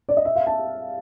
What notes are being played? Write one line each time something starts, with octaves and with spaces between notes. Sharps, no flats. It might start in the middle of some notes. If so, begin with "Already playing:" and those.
D5
D#5
E5
F5
A5